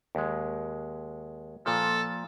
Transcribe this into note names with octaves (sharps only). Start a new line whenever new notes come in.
D#2 G#3
A#2 F3 A4